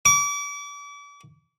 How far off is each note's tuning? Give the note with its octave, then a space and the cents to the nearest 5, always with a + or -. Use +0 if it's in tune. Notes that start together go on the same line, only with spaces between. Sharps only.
D6 -40